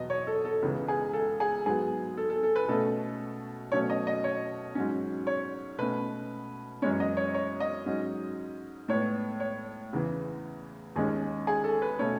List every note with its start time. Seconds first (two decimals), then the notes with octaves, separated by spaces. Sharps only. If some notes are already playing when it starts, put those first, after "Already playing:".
Already playing: E2 B2 F#3 B3 D#5
0.10 C#5
0.27 A4
0.45 A4
0.62 C#2 C#3 E3 G#3 B3
0.88 G#4
1.13 A4
1.40 G#4
1.66 G#2 F#3 B3 G#4
2.17 A4
2.30 A4
2.43 A4
2.56 B4
2.68 B2 A3 C#4 A4
3.72 B2 F#3 A3 C#4 C#5
3.90 D#5
4.07 D#5
4.24 C#5
4.75 G#2 F#3 C#4
5.27 C#5
5.78 B2 A3 C#4 B4
6.82 F#2 E3 G#3 C#4 C#5
7.00 D#5
7.17 C#5
7.34 C#5
7.60 D#5
7.86 G#2 F#3 C#4
8.88 A2 G#3 B3 C#5
9.40 C#5
9.93 E2 C#3 E3
10.96 D#2 D#3 G#3 C#4 G#4
11.47 G#4
11.64 A4
11.82 B4
11.99 B2 A3 C#4 C#5